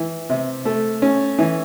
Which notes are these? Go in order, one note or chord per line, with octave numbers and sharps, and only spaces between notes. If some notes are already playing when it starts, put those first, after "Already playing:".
Already playing: E3
C3
A3
C#4
E3